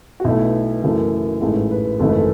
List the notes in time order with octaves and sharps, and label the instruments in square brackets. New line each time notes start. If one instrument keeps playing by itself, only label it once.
[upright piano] F#4
B1 B2 A3 E4
F#1 F#2 E3 A3
A1 G#2 E3 A3 G#4
B4
G#1 F#2 C#3 E3 A3 A4
B4
A4